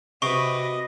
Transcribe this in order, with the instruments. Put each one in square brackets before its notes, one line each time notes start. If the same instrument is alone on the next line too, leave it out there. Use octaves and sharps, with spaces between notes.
[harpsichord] C3 [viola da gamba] F#4 B4 [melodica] D#5 [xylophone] C#6